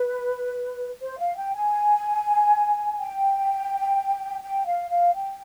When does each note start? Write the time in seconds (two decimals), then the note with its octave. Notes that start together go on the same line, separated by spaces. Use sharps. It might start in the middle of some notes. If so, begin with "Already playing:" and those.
Already playing: B4
1.01 C5
1.19 F5
1.37 G5
1.54 G#5
2.99 G5
4.42 G5
4.66 F5
4.91 F5
5.14 G5